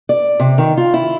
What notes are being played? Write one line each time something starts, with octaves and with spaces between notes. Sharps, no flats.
D5
C3
D#3
F4
E4